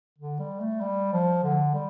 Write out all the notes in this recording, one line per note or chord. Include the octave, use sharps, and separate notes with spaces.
D3
G3
A3
G3
F3
D3
G3